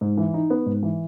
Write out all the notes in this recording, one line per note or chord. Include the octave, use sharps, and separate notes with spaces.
G#2
E3
D#4
B3
G#2
E3